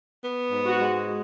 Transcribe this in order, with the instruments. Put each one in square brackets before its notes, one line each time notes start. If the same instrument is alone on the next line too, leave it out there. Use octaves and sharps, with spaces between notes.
[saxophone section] B3
G#2
[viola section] F#4
[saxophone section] G#3